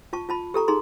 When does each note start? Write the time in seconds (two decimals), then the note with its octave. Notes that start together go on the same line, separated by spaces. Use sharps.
0.13 F4 A5 C#6
0.29 F4 A5 B5
0.54 G4 A4 A#5 C#6
0.68 D#4 G#4 A#5 C6